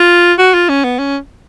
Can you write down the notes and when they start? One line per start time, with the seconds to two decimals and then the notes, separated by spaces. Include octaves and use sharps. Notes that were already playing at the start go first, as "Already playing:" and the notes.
Already playing: F4
0.39 F#4
0.54 F4
0.69 C#4
0.84 B3
0.99 C#4